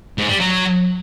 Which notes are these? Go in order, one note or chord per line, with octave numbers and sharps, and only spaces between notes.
G#2
G3
F#3